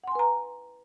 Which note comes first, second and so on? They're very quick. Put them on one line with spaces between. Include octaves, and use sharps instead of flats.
F#5 C6 G#5 B4 A#5